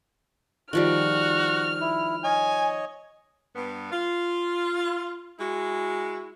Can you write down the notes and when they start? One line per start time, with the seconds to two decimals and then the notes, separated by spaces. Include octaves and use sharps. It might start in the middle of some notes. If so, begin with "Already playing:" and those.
0.73 D#3 F3 G3 F#4 F6
1.81 E4
2.24 C#5 D#5 G#5
3.56 G2 B3
3.92 F4
5.39 G#3 E4 F#4